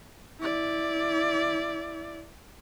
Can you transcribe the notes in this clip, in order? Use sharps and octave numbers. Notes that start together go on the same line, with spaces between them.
E4 D5